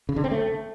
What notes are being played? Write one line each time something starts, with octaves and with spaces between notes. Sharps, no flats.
C#3
D3
C4
A3